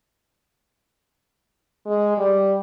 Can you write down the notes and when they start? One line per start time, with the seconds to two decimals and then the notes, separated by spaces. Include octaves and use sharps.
1.86 G#3
2.18 G3